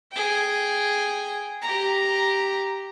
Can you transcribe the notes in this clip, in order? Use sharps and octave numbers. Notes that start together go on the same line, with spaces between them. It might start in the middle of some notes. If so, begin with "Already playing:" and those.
G#4 G5
G4 A#5